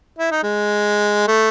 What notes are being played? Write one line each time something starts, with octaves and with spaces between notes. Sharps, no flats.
E4
D#4
G#3
A3